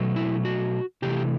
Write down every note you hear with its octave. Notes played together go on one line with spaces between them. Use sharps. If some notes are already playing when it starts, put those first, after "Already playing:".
Already playing: B2 F#3 A3
E4
F#4
C3 E3 A3 G4